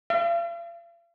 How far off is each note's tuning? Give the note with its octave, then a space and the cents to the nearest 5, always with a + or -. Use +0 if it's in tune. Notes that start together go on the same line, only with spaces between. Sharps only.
F5 -45